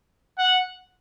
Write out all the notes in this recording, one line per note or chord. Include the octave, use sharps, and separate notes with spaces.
F#5